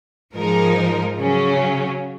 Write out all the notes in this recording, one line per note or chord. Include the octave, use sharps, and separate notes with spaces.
G#2 F3 G#3 D#4 A#4
C#3 F#3 C#4